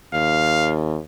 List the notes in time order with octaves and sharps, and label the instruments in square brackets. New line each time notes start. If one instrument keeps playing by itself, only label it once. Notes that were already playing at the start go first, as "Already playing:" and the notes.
[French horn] D#2 [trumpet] F5